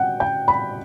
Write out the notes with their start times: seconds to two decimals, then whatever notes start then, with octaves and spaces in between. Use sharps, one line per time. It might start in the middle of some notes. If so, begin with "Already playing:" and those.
Already playing: F#5 G5
0.20 G5
0.48 B5